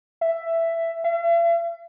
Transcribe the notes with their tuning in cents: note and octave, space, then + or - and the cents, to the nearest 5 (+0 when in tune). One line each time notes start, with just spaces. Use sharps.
E5 +10
E5 +45